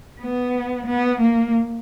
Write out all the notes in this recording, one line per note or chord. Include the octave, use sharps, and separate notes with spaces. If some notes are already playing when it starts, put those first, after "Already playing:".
B3
B3
A#3